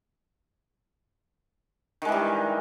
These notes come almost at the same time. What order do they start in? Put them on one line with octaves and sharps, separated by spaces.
D#3 G#3 E3 G3